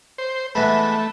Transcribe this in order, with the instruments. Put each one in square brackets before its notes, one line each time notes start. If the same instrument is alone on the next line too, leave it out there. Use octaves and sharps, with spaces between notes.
[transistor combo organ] C5
[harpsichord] E3 G#3 B3 [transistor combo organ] A3 [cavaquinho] B4 E5 B5